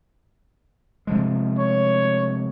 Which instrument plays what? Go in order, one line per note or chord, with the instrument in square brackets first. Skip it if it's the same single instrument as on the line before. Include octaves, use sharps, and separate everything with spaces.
[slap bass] C3 F3 G#3
[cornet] C#5